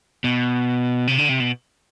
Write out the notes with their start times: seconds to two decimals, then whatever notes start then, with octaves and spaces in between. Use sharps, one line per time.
0.24 B2
1.07 C3
1.18 D3
1.29 C3
1.40 B2